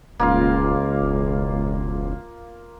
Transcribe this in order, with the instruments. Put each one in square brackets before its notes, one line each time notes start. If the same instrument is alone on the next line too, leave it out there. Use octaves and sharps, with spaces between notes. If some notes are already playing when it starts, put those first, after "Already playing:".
[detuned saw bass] D#1 [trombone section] C#2 [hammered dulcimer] A#3 F4 F5
[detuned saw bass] E1